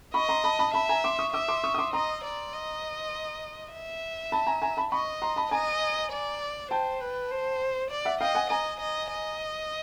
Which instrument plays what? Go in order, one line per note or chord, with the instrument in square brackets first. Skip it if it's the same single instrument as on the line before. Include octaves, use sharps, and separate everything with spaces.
[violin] D#5 [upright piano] B5 C#6
[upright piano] A#5 C6
A5 B5
A5 B5
[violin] E5 [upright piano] A5 B5
[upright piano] G#5 A#5
C6 D6
C#6 D#6
[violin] E5 [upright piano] D6 E6
[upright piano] C6 D6
C#6 D#6
D#6
C6 D6
[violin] D#5 [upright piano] A#5 C6
[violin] D5
D#5
E5
[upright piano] A5 B5
G#5 A#5
G#5 A#5
A5 B5
[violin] D#5 [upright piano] B5 C#6
[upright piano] A#5 C6
A5 B5
[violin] D#5 [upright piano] G#5 A#5
[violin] D5
[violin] C5 [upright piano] G5 A5
[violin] B4
C5
D5
[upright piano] E5 F#5
[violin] D#5 [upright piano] F5 G5
[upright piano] F#5 G#5
[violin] D#5 [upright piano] G#5 A#5
[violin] D#5
D#5